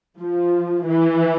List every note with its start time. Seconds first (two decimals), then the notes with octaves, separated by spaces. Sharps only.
0.20 F3
0.86 E3